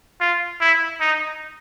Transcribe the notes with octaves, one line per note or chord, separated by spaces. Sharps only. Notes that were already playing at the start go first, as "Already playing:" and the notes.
F4
E4
D#4